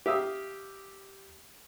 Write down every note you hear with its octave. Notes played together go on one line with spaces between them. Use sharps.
G4 E5 F5 D#6